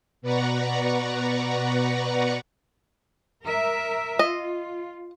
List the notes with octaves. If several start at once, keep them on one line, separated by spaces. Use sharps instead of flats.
B2 B4 D5 F#5 A#5 C#6
A#4 E5
F4 D#5